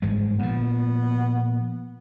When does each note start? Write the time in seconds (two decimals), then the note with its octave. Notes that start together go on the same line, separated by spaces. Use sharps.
0.02 G1 G#2 G#3
0.39 A#2 F3 B3